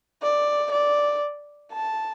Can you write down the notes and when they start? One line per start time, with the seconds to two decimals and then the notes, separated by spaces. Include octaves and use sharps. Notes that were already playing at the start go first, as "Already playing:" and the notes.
0.23 D5
0.72 D5
1.72 A5